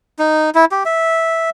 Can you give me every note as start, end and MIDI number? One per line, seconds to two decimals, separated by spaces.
0.19 0.50 63
0.55 0.65 64
0.71 0.84 67
0.85 1.50 76